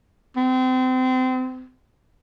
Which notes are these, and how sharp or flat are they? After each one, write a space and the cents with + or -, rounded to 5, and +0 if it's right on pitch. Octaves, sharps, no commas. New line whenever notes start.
C4 -30